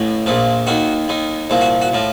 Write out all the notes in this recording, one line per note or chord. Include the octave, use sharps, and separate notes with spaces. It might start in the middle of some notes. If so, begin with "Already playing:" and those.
Already playing: A1 A2
A#1 A#2 F3
D#2 D#3 F#4
D#2 D#3
C2 A#2 F3
F#4
F#4
A2 F3